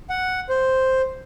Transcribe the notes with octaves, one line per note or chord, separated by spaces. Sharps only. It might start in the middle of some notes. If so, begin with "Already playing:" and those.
F#5
C5